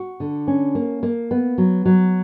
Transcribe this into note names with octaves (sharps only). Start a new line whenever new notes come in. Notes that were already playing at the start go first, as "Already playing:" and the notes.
Already playing: F#4
D3
C#4
A#3
A#3
B3
F#3
F#3